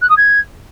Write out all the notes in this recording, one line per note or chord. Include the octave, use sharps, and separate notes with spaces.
F#6
D#6
G#6